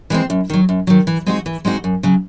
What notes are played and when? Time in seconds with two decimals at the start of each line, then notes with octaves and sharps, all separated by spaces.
0.10 E3 G#3 C4
0.30 F#2
0.50 D#3 F#3
0.69 F#2
0.87 D#3 F#3
1.07 E3
1.27 G#3 C4 D#4 F#4
1.46 E3
1.65 G#3 C4 D#4 F#4
1.84 F#2
2.03 C#3 F#3